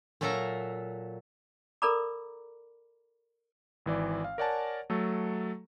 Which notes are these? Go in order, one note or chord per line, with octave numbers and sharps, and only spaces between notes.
A#2 F#3 A4 E5 F5 A#5
A4 A#4 D5 A#5 B5 D6
G#1 E3 D5
F5
A#4 C#5 D5 F#5 G#5 A5
F#3 A3 A4